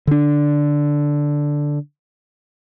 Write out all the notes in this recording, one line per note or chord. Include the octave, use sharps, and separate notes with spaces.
D3 D4